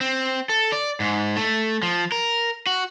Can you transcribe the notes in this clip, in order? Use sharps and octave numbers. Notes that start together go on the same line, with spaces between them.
C4
A4
D5
G#2
A3
F3
A#4
F#4